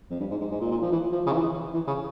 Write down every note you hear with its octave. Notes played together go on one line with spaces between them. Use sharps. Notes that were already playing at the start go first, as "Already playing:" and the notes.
F2
G2
G#2
G#2
G#2
A#2
A#2
F3
E3
F3
C#3
E3
E3
C#3